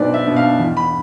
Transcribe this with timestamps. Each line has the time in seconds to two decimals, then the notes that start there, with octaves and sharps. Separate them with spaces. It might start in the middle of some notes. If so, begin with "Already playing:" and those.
Already playing: B1 B2 B3 D4 B4 C5 D5
0.14 E5
0.25 B2 B3 D4
0.37 F5
0.59 E2
0.77 B5